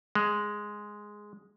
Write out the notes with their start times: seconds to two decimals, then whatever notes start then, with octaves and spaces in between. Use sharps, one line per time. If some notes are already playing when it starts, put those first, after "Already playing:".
0.15 G#3